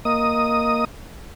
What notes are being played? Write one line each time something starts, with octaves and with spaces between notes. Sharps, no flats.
A#3 D#5 D#6